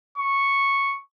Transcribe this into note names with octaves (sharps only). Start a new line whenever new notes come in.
C#6